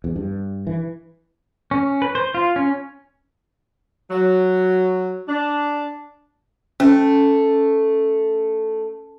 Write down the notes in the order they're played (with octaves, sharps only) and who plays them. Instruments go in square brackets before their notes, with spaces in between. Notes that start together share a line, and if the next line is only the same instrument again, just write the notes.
[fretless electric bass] E2
G2
E3
[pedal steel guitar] C#4
B4
C5
F4
C#4
[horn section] F#3
D4
[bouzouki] A3 [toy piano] C#4